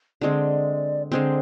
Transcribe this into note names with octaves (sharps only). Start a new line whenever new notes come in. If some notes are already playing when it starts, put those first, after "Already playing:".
D3 G#3 C4 D5
D3 G#3 C4 C5